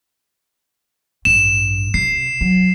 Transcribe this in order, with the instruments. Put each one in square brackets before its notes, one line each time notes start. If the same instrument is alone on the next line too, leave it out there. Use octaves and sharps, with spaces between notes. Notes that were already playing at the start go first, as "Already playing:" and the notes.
[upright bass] A1 G2 [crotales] E7
[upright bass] C3 [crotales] C7
[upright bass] F#3